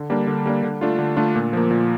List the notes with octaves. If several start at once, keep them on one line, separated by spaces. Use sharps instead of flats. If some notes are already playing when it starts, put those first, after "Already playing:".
Already playing: D3
G3 A#3 D4
D3
G3 A#3 D4
D3
A3 D4 F4
D3
A3 D4 F4
A#2
F3 A#3
A#2